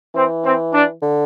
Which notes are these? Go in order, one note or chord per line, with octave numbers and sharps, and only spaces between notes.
E3 C4
C4
D4
D3